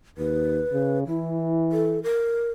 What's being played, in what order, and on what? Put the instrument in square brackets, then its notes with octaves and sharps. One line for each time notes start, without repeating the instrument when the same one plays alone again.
[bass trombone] D#2 [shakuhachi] B4
[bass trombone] C#3
[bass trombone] E3 [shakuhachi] E4
[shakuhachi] A4
A#4